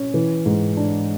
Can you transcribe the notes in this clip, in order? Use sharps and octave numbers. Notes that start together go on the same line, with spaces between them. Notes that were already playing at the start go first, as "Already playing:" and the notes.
Already playing: C#4
E3
G#2
D4